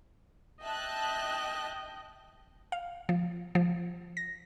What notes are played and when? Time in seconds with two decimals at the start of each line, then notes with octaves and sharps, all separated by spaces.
0.63 D#5 E5 G5 A5 F#6
2.72 F5
3.09 F3
3.55 F3
4.17 A#6